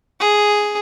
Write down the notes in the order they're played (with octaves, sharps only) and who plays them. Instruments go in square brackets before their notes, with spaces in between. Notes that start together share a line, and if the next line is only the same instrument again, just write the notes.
[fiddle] G#4